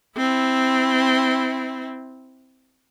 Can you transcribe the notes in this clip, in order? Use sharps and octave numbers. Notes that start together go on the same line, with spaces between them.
C4 E4